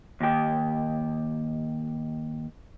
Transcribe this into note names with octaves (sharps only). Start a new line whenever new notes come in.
D#2 G4